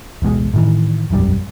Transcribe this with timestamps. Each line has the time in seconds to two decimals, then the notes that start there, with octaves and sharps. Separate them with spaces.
0.22 D1 A1 B2 G#3
0.54 A2 D#3 E3
1.10 E1 A#1 F#2 G3